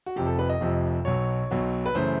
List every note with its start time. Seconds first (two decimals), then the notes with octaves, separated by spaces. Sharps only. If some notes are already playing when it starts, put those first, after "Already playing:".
0.06 F#4
0.16 F1 F2 C3 F3 G4
0.27 A4
0.39 B4
0.49 D#5
0.60 F1 F2 C3 F3
1.05 B1 B2 F#3 C#5
1.51 B1 B2 F#3
1.86 B4
1.94 F#2 C#3 E3 A3 C5